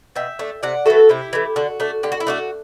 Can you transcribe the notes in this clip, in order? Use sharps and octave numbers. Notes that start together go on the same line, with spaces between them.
B2 E5 G5
A3 D4
C3 D5 F#5
E3 A3 F#4 A4
C3 E4 G4
E3 A3
D3 F#4
A3 D4
D3 G4
F#4
E4
A3 D4 F#4